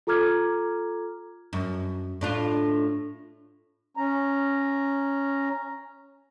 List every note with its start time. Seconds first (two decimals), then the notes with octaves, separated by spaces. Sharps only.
0.07 F4 A4 A#5 D6 F6 G#6
1.53 F#2
2.21 A2 D4 F4
3.97 C#4 A#5